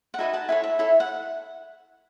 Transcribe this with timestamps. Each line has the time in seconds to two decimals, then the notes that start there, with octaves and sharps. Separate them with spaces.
0.14 F#5
0.18 D#4 F#4 B4 D#5 E5 G#5
0.33 F#5 A5
0.48 E4 A4 C#5 E5 G#5
0.64 E5
0.79 E4 A4 C#5
1.00 F#5